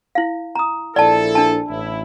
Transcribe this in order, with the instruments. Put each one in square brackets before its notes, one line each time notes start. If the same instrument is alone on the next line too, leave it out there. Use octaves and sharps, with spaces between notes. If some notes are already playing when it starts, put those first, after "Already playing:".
[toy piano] E4 F5
A#5 D#6
[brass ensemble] A#1 E4 A4 [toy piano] D5 A5
[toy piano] D4 A5
[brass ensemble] A1 E4